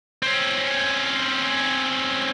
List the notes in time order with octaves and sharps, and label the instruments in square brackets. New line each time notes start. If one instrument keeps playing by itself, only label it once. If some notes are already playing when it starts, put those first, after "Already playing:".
[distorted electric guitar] C4 C#4